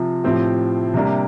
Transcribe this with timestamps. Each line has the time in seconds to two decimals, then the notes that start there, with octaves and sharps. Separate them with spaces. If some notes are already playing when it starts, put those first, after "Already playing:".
Already playing: C3 F3
0.24 A2 F3 C4 G4
0.94 C3 G3 A#3 D4 G4